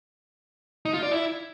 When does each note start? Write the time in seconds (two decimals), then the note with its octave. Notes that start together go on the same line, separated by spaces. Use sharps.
0.85 D#4
0.94 F4
1.03 D5
1.11 E4